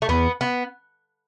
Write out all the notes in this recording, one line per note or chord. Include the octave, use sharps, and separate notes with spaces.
A3
E2 B3
B3